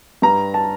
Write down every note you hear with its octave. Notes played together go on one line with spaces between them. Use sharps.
G2 A#5
A5